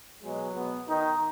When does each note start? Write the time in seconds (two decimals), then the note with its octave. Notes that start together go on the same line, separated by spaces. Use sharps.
0.23 B2 F#3 G#3
0.55 B2 B3
0.88 D#3 D#4